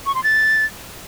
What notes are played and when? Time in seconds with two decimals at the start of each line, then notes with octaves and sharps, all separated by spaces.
0.06 C#6
0.15 C6
0.24 A6